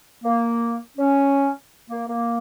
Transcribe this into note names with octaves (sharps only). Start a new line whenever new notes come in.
A#3
C#4
A#3
A#3